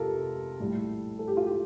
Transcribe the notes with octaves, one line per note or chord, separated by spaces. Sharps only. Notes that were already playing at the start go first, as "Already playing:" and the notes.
Already playing: F2 C3 F3 F4 G4 A4 A#4
A#1 A2 G3
A4
G4
F4
G4